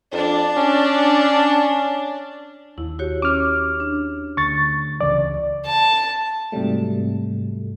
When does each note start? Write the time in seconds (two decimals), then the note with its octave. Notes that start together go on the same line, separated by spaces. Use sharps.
0.12 F2 D4
0.57 C#4
2.78 D#2 E4
2.99 F#4 G4 C#5
3.22 C#4 C#5 D6 F6
3.80 D4
4.37 D2 C#6 A6
5.01 C#2 C#3 E3 D5
5.66 A5
6.52 G#2 C3 F#3 G3 A3